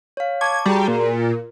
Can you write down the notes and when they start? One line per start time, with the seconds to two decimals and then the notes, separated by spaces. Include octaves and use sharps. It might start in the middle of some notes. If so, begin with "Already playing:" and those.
0.17 C#5 F5
0.41 A5 C#6 D6 G#6
0.66 G3 F#4 G#4 A#5
0.88 A#2 A#4